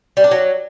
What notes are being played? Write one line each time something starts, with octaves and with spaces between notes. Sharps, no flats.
G3
D4
F#3